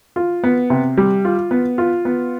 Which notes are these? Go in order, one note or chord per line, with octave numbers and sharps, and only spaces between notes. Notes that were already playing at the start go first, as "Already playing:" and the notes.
F4
B3
C3
G3
F4
B3
F4
B3